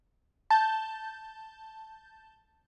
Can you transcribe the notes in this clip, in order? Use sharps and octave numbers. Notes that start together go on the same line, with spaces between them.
A5 G6